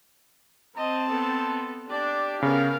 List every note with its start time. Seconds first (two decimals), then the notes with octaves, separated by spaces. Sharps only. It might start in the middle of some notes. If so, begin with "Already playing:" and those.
0.77 C4 D#5 A5
1.08 B3 A4
1.90 D4 G4 D5
2.42 C#3 B3 A#4 F5